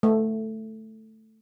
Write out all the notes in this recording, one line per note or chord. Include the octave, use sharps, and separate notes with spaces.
A3